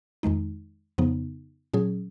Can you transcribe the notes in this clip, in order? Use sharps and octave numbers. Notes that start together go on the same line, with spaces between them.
F2 D#3 G#3 D#4
F2 C#3 F3 B3 D#4
A#2 F#3 C#4 G#4